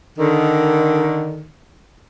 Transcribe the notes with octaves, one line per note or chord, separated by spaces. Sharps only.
D3 D#3